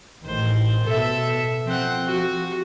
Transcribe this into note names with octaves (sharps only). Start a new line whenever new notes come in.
A1 A2 D#3 C5
B2 A4 E5
F3 C4 F#5
F#4